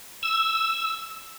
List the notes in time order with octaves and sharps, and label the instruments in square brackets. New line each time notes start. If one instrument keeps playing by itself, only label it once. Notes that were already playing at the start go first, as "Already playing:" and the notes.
[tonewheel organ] E6